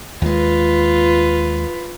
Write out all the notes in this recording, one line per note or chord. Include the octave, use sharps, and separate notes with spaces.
D#2 G#3 F4 B4